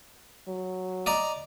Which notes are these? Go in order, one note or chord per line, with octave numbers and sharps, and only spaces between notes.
F#3
D5 D#5 A#5